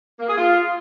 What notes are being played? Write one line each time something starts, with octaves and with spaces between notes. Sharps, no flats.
A#3
G#4
F4